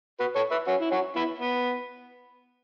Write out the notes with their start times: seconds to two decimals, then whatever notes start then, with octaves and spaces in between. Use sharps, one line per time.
0.20 F#4 B4
0.36 A4 C#5
0.51 B4 E5
0.67 C#4 F#4
0.80 E4
0.91 C#4 F#4
1.15 B3 E4
1.39 B3